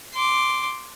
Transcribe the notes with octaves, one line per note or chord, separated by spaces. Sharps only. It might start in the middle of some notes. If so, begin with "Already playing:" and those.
C6 D6